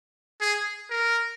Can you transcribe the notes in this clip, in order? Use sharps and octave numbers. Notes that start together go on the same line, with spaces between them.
G#4
A#4